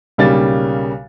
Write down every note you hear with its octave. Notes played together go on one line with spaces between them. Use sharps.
B1 C#3 G3 A#3 A6